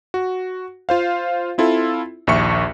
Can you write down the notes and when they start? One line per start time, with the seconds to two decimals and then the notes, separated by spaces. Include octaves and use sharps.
0.14 F#4
0.89 F4 C5 F5
1.58 C4 E4 F4 A4
2.27 A#1 D#2 E5 C#6 C#7